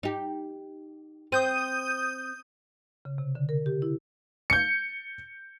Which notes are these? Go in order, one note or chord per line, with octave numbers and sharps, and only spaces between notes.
D#4 G4
C4 D#6 G6 D#7
C#3
C3
D3
A#4
G4
E4
G6 C#7